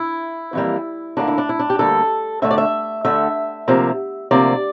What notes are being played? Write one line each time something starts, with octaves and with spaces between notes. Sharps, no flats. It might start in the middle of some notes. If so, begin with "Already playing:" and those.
Already playing: E4
F2 E3 G3 A#3
D2 D3 G3 A#3 D4
E4
D4
E4
D4
G4
D2 D3 G3 A#3 A4
D2 D3 A3 E5
D5
E5
D2 D3 A3 E5
D2 C3 F3 A#3
D2 C3 F3 A#3 D5